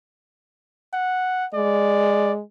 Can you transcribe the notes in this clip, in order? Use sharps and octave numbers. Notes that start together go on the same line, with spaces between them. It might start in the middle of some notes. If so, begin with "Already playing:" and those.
F#5
G#3 D5